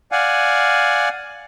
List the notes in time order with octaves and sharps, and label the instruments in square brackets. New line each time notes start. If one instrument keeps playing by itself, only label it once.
[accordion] D5 F5 F#5 G#5